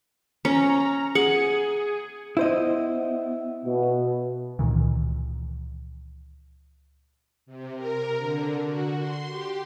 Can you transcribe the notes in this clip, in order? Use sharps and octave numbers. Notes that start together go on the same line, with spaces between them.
C#4 A#5
G#4 F#5
B3 E4 C5 D#5
B2
C#2 A#2 D#3 E3
C3
A#4
D3
F#4
C6
G4